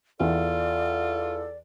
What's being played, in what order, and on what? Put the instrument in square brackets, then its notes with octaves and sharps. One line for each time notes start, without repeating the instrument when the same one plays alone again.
[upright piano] E2 [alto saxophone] F4 [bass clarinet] A4 [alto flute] D5